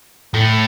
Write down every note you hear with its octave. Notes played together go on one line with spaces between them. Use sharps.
A2